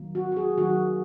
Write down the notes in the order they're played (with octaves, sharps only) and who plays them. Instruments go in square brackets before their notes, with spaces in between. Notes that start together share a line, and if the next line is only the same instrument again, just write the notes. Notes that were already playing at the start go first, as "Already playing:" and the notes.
Already playing: [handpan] D#3 F#3 A#3
F#4
F#4
G#4
D#3 F#3 A#3 F#4